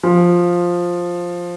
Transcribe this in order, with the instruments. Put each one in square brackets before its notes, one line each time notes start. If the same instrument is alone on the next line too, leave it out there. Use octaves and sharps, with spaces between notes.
[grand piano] F3